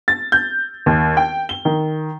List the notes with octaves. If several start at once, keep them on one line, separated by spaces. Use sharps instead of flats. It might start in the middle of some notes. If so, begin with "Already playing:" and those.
A6
G6
D#2
G5
G7
D#3